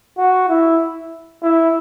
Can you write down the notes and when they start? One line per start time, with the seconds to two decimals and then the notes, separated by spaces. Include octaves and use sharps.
0.18 F#4
0.49 E4
1.42 E4